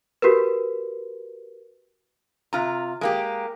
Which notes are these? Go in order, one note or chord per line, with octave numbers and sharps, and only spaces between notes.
F#4 G4 A#4 B4
C3 F4 A#5
G#3 A#3 G4